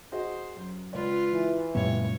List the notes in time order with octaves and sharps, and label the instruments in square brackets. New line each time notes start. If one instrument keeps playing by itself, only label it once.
[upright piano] F#4 G#4 D#5 [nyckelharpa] C5
[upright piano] F#2
[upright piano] C#2 D5 [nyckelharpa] F4 B4
[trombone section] E3
[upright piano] C#2 G3 [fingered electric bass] F#2 A#2 B3 [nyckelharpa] C#5